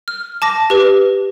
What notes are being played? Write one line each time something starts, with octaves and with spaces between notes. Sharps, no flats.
F6
A5 D6 A#6
G4 B4